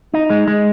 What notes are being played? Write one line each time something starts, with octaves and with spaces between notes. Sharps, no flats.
D#4
G#3
G#3